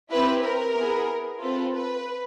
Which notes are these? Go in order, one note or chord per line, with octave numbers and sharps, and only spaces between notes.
C4 E4 G4 B4
A#4
B3 E4 G#4
C4 F4 A4 B4
B4